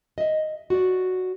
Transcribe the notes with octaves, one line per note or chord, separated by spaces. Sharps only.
D#5 E5
F#4 D5